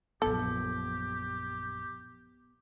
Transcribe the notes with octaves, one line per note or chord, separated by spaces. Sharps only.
A#1 F#2 B3 G4 A4